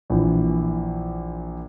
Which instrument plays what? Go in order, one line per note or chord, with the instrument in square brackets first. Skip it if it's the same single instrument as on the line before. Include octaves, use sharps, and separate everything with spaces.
[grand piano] A#1 E3